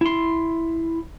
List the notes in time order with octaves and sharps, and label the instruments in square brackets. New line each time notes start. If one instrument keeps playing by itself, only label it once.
[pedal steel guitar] E4 C6